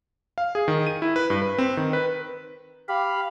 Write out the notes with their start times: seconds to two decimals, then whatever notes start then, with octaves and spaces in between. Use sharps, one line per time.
0.38 F5
0.55 G#4
0.68 D#3
0.87 D#7
1.02 E4
1.16 B4
1.30 G2
1.42 B4
1.58 C4
1.77 D#3
1.93 B4
2.89 G4 F5 B5